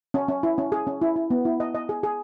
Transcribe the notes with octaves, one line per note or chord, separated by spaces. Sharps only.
C#4
C#4
E4
C#4
G#4
C#4
E4
E4
B3
E4
D#5
D#5
G#4
G#4